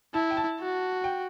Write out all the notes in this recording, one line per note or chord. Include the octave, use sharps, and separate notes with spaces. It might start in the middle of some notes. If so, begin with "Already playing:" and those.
E4 A5
G5
A5
F#4
G5